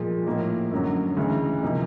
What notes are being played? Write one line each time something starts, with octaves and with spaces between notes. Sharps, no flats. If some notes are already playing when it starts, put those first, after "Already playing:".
Already playing: A#2 F3 G#3
A2 F3 A#3 D#4
F#2 D3 F#3
D2 C#3 E3 G#3
C3 F3 A#3 D#4